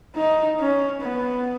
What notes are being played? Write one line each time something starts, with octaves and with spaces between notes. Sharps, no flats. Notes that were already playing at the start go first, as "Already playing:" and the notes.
D#4
C#4
B3